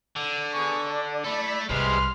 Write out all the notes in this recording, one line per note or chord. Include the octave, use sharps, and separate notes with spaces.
D3
B3 G#4 C#6
D4 D5
A3 E4 A4 B5
C2 C3 G#3 B4 C6 F6